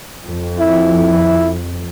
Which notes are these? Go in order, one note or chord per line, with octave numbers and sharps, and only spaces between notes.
F2
E4